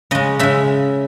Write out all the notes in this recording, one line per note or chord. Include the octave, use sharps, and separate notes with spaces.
C#3 G#3 D#5
C#3 G#3 E5